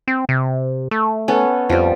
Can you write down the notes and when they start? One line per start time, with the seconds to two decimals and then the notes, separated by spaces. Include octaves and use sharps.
0.08 C4
0.29 C3
0.91 A3
1.28 B3 C#4 A4
1.69 F2 F3 G3